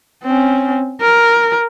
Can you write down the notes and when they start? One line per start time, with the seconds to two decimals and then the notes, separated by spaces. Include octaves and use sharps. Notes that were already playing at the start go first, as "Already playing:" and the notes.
0.24 C4 C#4
1.01 A#4